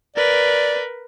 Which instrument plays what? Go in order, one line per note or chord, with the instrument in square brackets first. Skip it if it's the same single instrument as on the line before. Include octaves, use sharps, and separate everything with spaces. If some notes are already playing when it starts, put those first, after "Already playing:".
[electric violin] A#4 B4 [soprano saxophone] D5